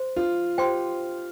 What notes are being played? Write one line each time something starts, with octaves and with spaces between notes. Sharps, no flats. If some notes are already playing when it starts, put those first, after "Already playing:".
Already playing: C5 C6
F4
G4 C5 G5 C6